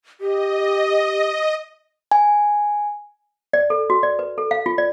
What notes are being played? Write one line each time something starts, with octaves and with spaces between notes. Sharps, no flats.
G4 D#5
G#5
D5
A4
F#4
D5
B4
A4
F5
F4
D5